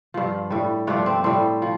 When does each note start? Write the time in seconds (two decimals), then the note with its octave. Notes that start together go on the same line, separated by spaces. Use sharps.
0.14 G2 F3
0.50 A2 G3
0.87 G2 F3 A3 D4
1.06 C4
1.24 A2 G3 C4
1.62 F3